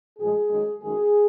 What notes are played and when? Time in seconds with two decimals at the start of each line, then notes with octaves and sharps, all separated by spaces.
0.18 A#2 F3 G#3 G#4
0.49 F#2 D#3 G#3
0.81 F#2 D#3 G#3 G#4